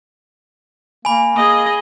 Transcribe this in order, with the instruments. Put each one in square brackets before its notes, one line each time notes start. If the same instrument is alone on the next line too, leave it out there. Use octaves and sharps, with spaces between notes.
[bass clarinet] A#3 [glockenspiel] G#5 B5
[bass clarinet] A#3 [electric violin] G#4 D#5